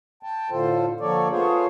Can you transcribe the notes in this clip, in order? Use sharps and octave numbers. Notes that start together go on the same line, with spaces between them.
G5 A5
A2 D3 F4 A4 C5
D3 F3 A#3 A4 C#5 D5
A3 B3 F4 G#4 C5 C#5